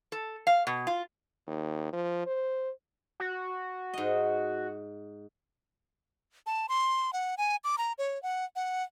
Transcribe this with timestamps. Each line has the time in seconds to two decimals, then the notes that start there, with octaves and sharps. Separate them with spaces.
0.12 A4
0.47 F5
0.67 B2
0.87 F4
1.47 D#2
1.93 F3
2.27 C5
3.20 F#4
3.94 G#2 D#5
6.46 A5
6.69 C6
7.13 F#5
7.38 G#5
7.64 D6
7.78 A#5
7.98 C#5
8.23 F#5
8.56 F#5